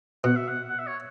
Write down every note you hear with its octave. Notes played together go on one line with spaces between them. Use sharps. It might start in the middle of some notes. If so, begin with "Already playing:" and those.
B2 F#5
E5
F#5
F#5
E5
C#5